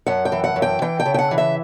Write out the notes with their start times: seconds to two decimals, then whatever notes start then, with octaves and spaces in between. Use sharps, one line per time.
0.07 F#2 F#5
0.25 G5
0.32 E3
0.44 F#5
0.56 F#2
0.62 G5
0.82 E3 G5
1.00 G5
1.06 C#3
1.14 G5
1.18 F#5
1.31 E3
1.38 E5